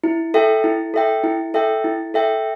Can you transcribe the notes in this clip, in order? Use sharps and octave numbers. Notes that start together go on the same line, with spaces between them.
E4
A4 E5 G5
E4
A4 E5 G5
E4
A4 E5 G5
E4
A4 E5 G5